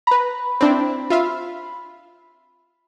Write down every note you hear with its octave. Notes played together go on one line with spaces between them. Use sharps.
B4 A#5 B5
C4 D4 E4
F4 E5 F5